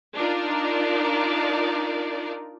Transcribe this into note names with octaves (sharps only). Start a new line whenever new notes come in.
D4 D#4 F4 A#4 D5